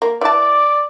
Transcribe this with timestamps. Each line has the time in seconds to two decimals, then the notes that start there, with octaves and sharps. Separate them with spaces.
0.02 A#3
0.21 E3 D5 A5